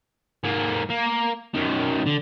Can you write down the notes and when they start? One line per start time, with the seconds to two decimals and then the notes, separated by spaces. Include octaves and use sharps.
0.44 G#2 A#3
0.90 A#3
1.55 F#2 D#3
2.06 D3